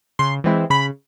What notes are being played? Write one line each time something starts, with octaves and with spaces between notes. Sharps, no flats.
C#3 C6
E3 G#3 C4 E4
C#3 B5